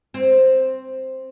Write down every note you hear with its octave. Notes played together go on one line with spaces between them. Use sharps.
C4